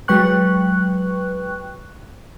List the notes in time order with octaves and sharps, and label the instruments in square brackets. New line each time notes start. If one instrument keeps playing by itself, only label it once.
[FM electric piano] F#3 G#3 B4 G5 C#6 F#6